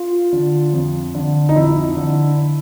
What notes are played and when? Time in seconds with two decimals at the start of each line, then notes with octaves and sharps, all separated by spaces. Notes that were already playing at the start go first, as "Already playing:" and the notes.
Already playing: F4
0.33 D3
0.73 F2
1.15 D3
1.49 D#4
1.56 F2 E4
1.97 D3